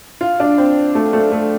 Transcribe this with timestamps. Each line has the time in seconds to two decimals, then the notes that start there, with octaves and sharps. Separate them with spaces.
0.21 F4
0.40 D4
0.58 C4
0.95 A3
1.13 A3
1.32 A3